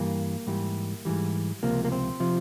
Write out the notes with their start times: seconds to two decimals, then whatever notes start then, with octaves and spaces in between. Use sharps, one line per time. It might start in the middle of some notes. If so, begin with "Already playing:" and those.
Already playing: G2 E3 G3 A#3
0.47 G#2 E3 G3
1.05 G#2 E3 G3
1.63 C#2 C3 F3 A#3
1.85 A#3
1.92 C4
2.20 C3 F3